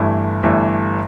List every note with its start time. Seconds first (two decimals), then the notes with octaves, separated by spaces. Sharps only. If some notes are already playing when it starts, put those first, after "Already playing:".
Already playing: G1 G2 E3 A3 E4
0.43 G1 G2 E3 A3 E4